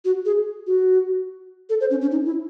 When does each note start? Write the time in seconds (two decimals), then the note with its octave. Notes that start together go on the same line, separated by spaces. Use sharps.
0.05 F#4
0.25 G#4
0.67 F#4
1.69 A4
1.80 C5
1.90 C#4
2.01 C#4
2.11 D#4
2.25 E4